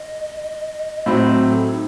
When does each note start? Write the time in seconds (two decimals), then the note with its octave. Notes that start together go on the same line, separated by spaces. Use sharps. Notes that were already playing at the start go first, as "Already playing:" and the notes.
Already playing: D#5
1.06 A2 F#3 C4 D#5
1.28 C5
1.49 A4
1.71 D#4